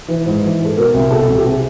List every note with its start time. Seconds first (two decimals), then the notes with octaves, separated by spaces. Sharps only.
0.08 E3 B4
0.26 G#2
0.43 E3
0.60 G#2 A4
0.77 B2 A#4
0.94 C2
1.11 B2 A4
1.28 C2
1.38 G4
1.45 C3 G#4